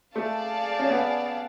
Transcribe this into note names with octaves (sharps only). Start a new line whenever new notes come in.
A3 G#4 D5 F5 A5
C#4
B3